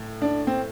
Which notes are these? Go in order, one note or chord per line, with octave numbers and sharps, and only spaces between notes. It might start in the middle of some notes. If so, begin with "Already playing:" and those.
Already playing: A2
D4
C4